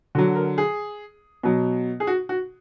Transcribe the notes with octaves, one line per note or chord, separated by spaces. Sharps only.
D3 F#3 F#4
A#4
G#4
B2 F#3
G#4
F#4
F#4